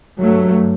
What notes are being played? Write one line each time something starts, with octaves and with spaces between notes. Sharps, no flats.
G2 F#3 A3